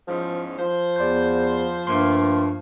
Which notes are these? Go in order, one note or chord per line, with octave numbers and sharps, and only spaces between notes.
E2 G#2 F3 C#4
F3 C5
E2 D5 C6 G6
G2 A3 A#3 C6 F6